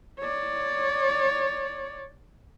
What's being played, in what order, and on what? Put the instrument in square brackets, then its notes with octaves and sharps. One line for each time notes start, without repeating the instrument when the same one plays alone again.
[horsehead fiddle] C#5 D5